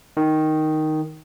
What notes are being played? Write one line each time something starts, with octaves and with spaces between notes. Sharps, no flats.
D#3